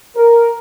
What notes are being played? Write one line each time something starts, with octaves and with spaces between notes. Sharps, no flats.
A#4